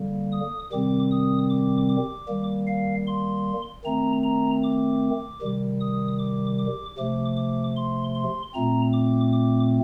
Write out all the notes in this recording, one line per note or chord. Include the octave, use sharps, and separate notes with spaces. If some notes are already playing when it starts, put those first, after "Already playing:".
Already playing: D3 G3 A#3
D#6
C3 D#3 G3 C4 D6
D#6
D6
D6
D#3 G3 A#3
F5
C6
D#3 A3 C4 A#5
A#5
D6
C3 D#3 G3
D#6
D6
D6
C3 F3 A3 D6
D6
C6
C6
A#2 A3 C4 A#5
D6
D6